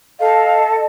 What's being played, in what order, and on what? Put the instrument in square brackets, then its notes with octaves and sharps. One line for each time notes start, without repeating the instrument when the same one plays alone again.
[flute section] A4 [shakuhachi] D#5 [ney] F5